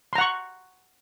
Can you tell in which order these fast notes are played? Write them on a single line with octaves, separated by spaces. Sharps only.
C6 A#5 F#5 C#6